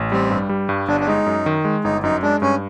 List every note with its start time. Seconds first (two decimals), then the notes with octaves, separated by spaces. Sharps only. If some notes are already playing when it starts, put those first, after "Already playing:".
Already playing: A1
0.11 G3 C4
0.30 G2
0.49 G3
0.69 G2
0.88 G1 D4
1.00 D4
1.07 G#3 D#4
1.26 F#2
1.46 D#3
1.65 G#3
1.84 G1 D#4
2.03 F#2 D#4
2.23 G#3 D4
2.42 G2 C#4